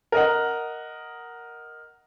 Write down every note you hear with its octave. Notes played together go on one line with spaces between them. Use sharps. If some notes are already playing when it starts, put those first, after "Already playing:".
A#4 D#5 F#5